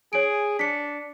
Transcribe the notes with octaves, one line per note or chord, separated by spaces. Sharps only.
G#4 C#5 D7
D4 B6 C#7